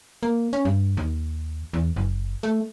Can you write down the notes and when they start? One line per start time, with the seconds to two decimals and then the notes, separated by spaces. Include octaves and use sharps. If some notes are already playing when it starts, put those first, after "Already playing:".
0.23 A#3
0.53 C#4
0.65 G2
0.97 D#2
1.73 E2
1.96 F#1
2.43 A3